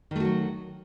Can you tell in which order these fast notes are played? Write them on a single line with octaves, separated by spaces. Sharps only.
D#3 A3 F#4 F#3